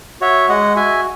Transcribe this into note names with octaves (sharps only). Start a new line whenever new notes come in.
F#4 C#5 E5
G#3 D#5 F#5
F#4 E5 G#5